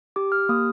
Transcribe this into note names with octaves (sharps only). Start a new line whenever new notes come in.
G4 D6
F6
A#3 D#6